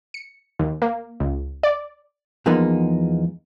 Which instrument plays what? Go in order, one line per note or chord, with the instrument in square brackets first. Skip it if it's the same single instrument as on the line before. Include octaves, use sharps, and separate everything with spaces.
[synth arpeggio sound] C#7
D#2
A#3
C#2
D5
[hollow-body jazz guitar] E2 F3 G#3 A#3 B3 D#4